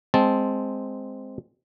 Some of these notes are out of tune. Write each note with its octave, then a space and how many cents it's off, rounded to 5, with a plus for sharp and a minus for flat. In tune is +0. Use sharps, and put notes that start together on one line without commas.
G#3 +0 C4 +0 A5 -10